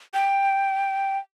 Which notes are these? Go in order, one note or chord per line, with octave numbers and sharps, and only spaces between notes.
G5